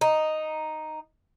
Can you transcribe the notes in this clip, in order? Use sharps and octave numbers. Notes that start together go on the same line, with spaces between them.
D#4